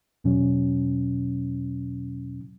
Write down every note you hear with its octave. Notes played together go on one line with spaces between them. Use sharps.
E2 B2 F#3 C#4